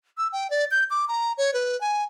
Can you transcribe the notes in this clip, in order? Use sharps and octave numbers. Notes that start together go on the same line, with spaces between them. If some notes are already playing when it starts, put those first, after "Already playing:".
E6
G5
D5
G6
D6
A#5
C#5
B4
G#5